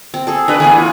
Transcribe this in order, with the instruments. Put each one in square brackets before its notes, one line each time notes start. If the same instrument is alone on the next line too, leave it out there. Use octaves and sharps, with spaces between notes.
[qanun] C4
G#4 A4
[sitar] D4 F#4 B4 [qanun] A#4
[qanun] E3 A3 B3 [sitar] G#4 [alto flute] G#5
[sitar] F4